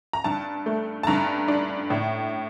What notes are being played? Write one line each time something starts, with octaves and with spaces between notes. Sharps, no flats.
A#5
G2 A5
A3
A5
G2 A#5
D4
A2